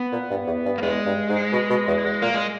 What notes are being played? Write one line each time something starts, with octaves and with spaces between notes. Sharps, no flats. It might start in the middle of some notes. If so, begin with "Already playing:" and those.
Already playing: B3
A#2
G2
E2
G2
A#3
E2 G#3
G2
G#2
B2
B2
E2
E2
A#2 A#3
G#3